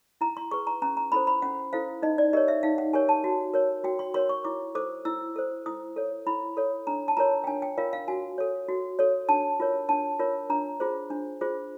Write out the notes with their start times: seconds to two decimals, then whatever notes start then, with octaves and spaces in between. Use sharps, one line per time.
0.21 E4 A#5
0.37 C6
0.51 G#4 B4 C#6
0.67 A#5
0.82 C#4 A#5
0.97 A#5
1.12 E4 A4 C5 B5
1.27 B5
1.42 C#4 F#5
1.73 E4 A4 C5 F5
2.02 D#4 D#5
2.18 D5
2.33 G4 A#4 C#5 D#5
2.48 E5
2.63 D#4 F5
2.78 F#5
2.93 G4 A#4 C#5 G#5
3.09 A5
3.24 F#4
3.54 A#4 C#5
3.84 F#4 G5
3.99 C6
4.14 A#4 C#5 C6
4.29 C#6
4.45 E4 D6
4.75 A4 C5 D6
5.05 E4 E6
5.36 A4 C5
5.66 E4 D#6
5.96 A4 C#5
6.27 E4 B5
6.57 A4 C#5
6.87 D4 A#5
7.08 A5
7.17 F4 A#4 C#5 A#5
7.44 G5
7.47 D4 G#5
7.62 G5
7.77 F4 A#4 C#5 F5
7.93 F5
8.08 F#4 G#5
8.38 A4 C#5
8.69 F#4
8.99 A4 C#5
9.29 D4 A5
9.60 F4 A#4 C#5
9.89 D4 A5
10.19 F4 A#4 C#5
10.50 D4 A#5
10.80 F4 G#4 C5
11.10 D4
11.41 F4 G#4 C5